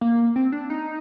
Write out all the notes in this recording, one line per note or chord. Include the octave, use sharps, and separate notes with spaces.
A#3
C4
D4
D#4